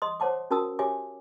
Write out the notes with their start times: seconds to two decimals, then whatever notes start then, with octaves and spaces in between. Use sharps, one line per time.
0.02 D#5 C6 D#6
0.20 C5 C#5 F#5 A5 D6
0.51 C#4 F#4 A#4 A5 D#6 E6
0.79 G4 C#5 E5 G#5 D6